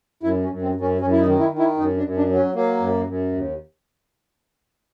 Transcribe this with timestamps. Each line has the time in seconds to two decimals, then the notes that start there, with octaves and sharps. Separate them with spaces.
0.23 F#2 E4
0.43 C#4
0.49 F#2
0.62 C4
0.75 F#2
0.81 C#4
1.00 F#2 C#4
1.12 E4
1.20 D#4
1.27 D#3
1.39 E4
1.52 D#3
1.59 E4
1.77 F#2 D#4
1.97 D4
2.03 F#2
2.17 D4
2.30 F#3
2.35 C#4
2.55 F#3 A#3
2.80 F#2
3.06 F#2
3.32 D#2